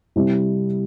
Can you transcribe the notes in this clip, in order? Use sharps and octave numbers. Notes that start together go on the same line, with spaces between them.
C3 G3 C4 E4